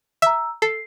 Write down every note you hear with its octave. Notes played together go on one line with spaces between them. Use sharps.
E5 A#5 E6
A4 C7